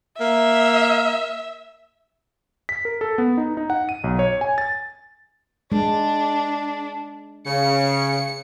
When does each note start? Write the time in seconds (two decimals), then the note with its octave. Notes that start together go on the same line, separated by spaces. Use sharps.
0.20 A#3 E5
2.69 B6
2.85 A#4
3.01 A4
3.18 B3
3.37 D#4
3.57 D#4
3.70 F#5
3.89 D#7
4.04 B1
4.19 C#5
4.41 G#5
4.58 A6
5.72 G#3 D4
7.47 C#3 C#7